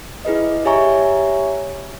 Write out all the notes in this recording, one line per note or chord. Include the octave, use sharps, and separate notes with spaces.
E4 G#4 B4 D#5
G4 C#5 E5 G#5 A#5 C#6